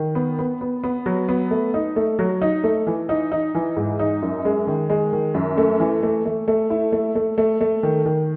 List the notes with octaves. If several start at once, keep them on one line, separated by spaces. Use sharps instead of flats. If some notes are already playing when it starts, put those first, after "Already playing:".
Already playing: D#3
B3
B3
B3
B3
F#3
B3
A3
D#4
A3
F#3
D#4
A3
E3
D#4
D#4
E3
G#2
D#4
F#2
G#3
D#3
G#3
D#3
F#2
A3
E3
A3
A3
A3
E4
A3
A3
A3
A3
D#3
D#3